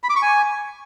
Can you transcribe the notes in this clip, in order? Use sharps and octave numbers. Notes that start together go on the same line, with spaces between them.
B5
D6
C#6
G#5